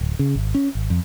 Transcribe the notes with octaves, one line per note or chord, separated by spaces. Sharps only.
D1
C#3
G#1
C#4
G#1
F2